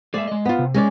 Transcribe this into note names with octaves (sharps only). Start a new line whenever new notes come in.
G#3 A#3 D5 E5
G#3 D#5
B3 F4
C3
G#3 C#4 D5